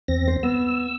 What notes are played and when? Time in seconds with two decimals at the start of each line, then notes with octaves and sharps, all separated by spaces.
0.08 E2 C4 A#6
0.28 C5
0.43 B3 E6